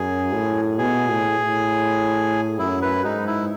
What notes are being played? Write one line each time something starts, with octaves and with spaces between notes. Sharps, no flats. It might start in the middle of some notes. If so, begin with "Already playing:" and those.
Already playing: F#2 G#4
A2
B2 G#4
A2
A2
F#2 E4
B4
G#2 D#4
E4